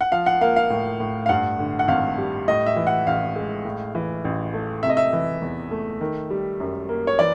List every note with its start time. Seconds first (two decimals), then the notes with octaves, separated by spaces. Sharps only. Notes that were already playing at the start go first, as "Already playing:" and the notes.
0.01 F#5
0.12 F3 F5
0.26 F#5
0.41 A#3 F5
0.56 F5
0.70 A2
1.00 A2
1.26 F5
1.29 G2 F#5
1.59 D3
1.79 F#5
1.88 G#1 F5
2.18 G3
2.48 A2 D#5
2.66 E5
2.76 E3
2.87 F#5
3.07 A1 F5
3.36 G#3
3.65 A2
3.95 E3
4.25 A1
4.54 A3
4.83 C3 E5
4.90 D#5
4.97 E5
5.13 E3
5.42 E2
5.71 A3
6.01 D#3
6.30 G3
6.60 F#2
6.89 A#3
7.07 C#5
7.19 E3 D5